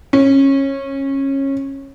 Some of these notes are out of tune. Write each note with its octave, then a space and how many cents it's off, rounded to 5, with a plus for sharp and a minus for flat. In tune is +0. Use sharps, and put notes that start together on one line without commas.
C#4 -20